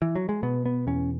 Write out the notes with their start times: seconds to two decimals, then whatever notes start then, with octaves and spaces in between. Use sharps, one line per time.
0.02 E3
0.16 F#3
0.29 G#3
0.43 B2 B3
0.66 B3
0.87 E2 C#4